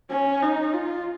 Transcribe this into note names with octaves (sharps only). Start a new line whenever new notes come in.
C#4
D#4
F4